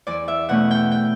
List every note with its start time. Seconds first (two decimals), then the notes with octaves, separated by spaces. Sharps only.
0.07 E2 D5
0.28 E5
0.49 B2 A3 C#4 F#5
0.71 G5
0.91 G5